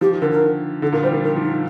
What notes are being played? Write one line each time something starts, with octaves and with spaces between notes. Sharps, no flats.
F3 G4
D#3
D3 A#4
D3 A#4
D#3
D3 A4
A#2 A#4
G3 C5
F3 A#4
D#3 A#4
F3
D#4
D#3